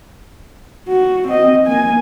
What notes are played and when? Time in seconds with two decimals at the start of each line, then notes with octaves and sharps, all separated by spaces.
0.88 F#4
1.27 C4 D#5
1.67 A#3 G#5